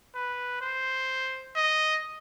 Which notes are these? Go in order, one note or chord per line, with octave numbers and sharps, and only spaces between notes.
B4
C5
D#5